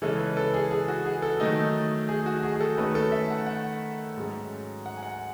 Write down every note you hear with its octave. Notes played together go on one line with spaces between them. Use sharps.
C#3 E3 G#3 C#4 A4
B4
A4
G#4
G#4
F#4
G#4
A4
D#3 F#3 A3 D#4
G#4
F#4
G#4
G#4
A4
D#3 A3 C#4 B4
A4
E5
F#5
F#5
G#2 F#3 C#4
F#5
G#5
F#5